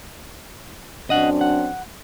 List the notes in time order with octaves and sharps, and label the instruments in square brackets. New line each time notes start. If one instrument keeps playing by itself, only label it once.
[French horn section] F#2 C4 D4 [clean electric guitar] D#5 F#5
[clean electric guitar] F#5